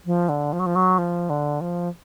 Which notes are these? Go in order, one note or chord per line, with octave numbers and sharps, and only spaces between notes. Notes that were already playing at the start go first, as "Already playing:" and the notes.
F3
D3
F3
F#3
F3
F#3
F3
D3
F3